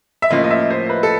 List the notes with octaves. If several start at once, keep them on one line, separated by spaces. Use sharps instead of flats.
E5
A2 F3 A#3 C#4 F4 D#5
D#5
E5
C5
B4
A4